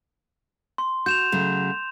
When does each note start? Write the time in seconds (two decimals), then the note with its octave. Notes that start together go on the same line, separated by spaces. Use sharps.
0.78 C6
1.06 F#4 G6 E7 F7
1.32 C#3 F#3 A3